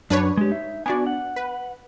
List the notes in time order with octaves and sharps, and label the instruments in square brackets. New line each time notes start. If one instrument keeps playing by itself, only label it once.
[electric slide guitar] F#2 [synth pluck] D4 B4 C#5
[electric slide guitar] G#3 G4
D#4 E5
[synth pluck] B3 D4 D5 [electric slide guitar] F#4 G#5
[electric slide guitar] F#5
[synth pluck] B4